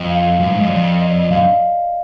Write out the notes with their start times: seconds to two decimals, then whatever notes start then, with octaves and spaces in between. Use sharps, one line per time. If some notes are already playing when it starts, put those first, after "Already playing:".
Already playing: F2 D#5
0.10 F5
0.40 F#2
0.50 G#2
0.60 F#2 D#5
0.69 F2 D5
1.01 D#5
1.10 D5
1.19 D#5
1.31 F#2 F5